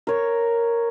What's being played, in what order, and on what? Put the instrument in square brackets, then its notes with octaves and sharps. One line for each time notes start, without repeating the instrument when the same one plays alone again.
[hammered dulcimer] A#4 C#5